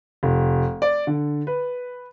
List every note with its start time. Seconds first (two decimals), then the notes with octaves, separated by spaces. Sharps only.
0.23 F1
0.82 D5
1.07 D3
1.47 B4